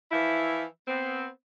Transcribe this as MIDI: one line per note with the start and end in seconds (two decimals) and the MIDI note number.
0.12 0.64 52
0.12 0.64 53
0.12 0.64 64
0.87 1.28 59
0.87 1.28 60